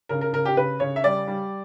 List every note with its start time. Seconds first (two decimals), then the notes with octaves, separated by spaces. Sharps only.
0.09 C#3 A#4
0.21 A#4
0.33 C#3 A#4
0.45 G4
0.57 C#3 B4
0.80 C#3 C#5
0.96 E5
1.04 G3 D5
1.28 G3